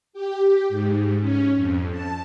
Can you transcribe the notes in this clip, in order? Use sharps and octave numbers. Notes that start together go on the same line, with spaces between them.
G4
G#2
C#4
F2
A5